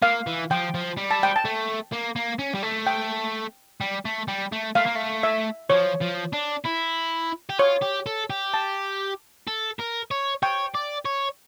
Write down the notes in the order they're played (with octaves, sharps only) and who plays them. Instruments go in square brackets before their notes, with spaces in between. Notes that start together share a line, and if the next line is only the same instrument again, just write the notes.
[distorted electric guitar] A#3 [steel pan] F5
[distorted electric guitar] E3
[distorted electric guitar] F3 [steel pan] G5
[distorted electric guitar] F3
G3
[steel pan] A5
G5
A5
[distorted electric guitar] A3
A#3
A#3
C#4
G3
A3
[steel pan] G5
[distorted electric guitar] G3
A3
G3
A3
[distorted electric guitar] A3 [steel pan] F5
[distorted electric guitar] A#3
A3
[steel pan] E5
[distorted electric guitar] F3 [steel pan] C#5
[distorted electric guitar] F3
D4
E4
G4
[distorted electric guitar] F4 [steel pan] C#5
[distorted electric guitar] G4
A4
G4
[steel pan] A5
[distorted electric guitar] A4
A#4
C#5
[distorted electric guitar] C#5 [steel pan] G5
[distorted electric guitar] D5
C#5